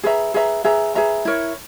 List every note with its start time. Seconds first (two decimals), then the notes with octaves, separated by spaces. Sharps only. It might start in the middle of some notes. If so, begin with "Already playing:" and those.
0.03 G#4 B4 E5 A#5
0.34 G#4 B4 E5 A#5
0.64 G#4 B4 E5 A#5
0.95 G#4 B4 E5 A#5
1.25 E4 A#4 C#5